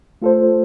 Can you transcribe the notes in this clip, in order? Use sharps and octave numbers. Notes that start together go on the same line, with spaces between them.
A3 F4 A4 C5